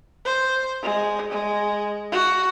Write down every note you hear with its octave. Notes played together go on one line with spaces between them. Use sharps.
C5
G#3
G#3
F#4